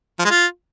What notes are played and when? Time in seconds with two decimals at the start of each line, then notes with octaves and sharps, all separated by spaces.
0.19 F3
0.25 G#3
0.30 F4